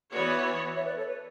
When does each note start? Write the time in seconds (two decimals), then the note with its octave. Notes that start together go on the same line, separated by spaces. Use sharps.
0.12 E3 B3 F#4 B4 C#5 D5
0.76 C#5 E5
0.86 B4 D5
0.97 A4 C#5
1.07 B4